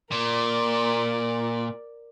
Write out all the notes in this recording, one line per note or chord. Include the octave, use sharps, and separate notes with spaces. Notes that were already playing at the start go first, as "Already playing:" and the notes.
A#2 A#4 D5